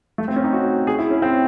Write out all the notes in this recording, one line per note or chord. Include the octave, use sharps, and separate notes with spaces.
A3
C4
C#4
D#4
F#4
G#4
E4
C#4
C4